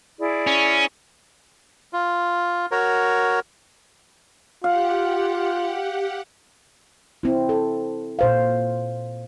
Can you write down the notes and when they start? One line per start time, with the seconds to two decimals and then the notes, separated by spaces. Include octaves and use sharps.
0.19 E4 G#4 D5
0.47 C#4
1.93 F4
2.71 F#4 A#4 C#5
4.64 F4 G4 F5 F#5
7.23 C4 E4
7.49 A4
8.19 A#2 C5 F5